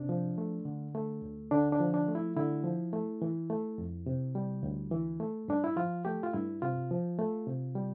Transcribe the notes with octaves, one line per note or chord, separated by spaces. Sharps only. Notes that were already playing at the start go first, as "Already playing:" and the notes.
Already playing: C3 D4
F3
A3
D3
A3
D2
D3 D4
D4
F3
D4
A3
E4
D3 E4
F3
A3
E3
A3
F2
C3
G3
D2
E3
A3
G2 D4
E4
F3 F4
A3 G4
F4
G2 E4
C3 F4
F3
A3
C3
G3